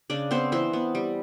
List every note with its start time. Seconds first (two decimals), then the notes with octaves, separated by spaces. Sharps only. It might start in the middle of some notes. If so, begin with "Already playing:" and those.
0.10 C#3 D4 D5
0.31 B3 C4 C5
0.52 E3 C4 C5
0.73 B3
0.95 G3